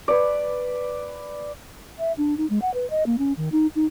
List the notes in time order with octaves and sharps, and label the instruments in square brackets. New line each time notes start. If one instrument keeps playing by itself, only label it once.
[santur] B4 D5
[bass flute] E5
D4
D#4
G#3
F#5
B4
D#5
A#3
C#4
D#3
D#4
D#4